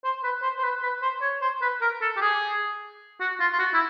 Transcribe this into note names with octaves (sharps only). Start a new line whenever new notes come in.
C5
B4
C5
C5
B4
B4
C5
C#5
C5
B4
A#4
A4
G4
G#4
F#4
F4
F4
F#4
E4